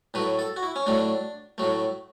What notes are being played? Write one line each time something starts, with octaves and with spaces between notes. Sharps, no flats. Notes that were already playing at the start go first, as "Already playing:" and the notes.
A2 F#3 A3 B4
A4
F#4
E4
C#4
A2 F#3 A3 D4
A2 F#3 A3